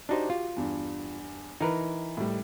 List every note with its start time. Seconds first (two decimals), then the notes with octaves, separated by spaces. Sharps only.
0.09 D4 D#4 F#4 G4 C5
0.30 F4
0.56 E2 G2
1.61 E3 D#4 A#4 B4
2.17 A2 G3